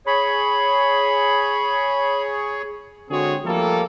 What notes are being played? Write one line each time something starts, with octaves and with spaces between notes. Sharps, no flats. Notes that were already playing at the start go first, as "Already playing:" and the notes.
G#4 C#5 B5
D3 G#3 C4 F#4 G#4 C#5
F3 G3 A3 A#3 A4